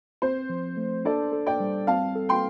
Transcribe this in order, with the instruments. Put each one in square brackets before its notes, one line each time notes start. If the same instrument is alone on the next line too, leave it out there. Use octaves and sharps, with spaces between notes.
[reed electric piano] C4 [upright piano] C5
[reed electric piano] F3
A3
[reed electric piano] D4 [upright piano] A4 D5
[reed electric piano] A4
[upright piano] D5 G5
[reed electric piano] G3
[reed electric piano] C4 [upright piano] F5 A5
[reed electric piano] A4
[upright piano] G5 C6